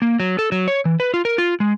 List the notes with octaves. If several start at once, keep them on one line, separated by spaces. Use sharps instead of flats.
A#3
F#3
A4
F#3
C#5
E3
B4
F4
A#4
F4
G#3